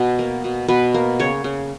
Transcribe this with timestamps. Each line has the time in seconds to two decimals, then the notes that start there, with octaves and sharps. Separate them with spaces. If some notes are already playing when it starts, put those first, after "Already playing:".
Already playing: B2
0.19 A#3
0.44 B2
0.68 B2 B4
0.94 A#3
1.19 C#3 C#5
1.44 C#3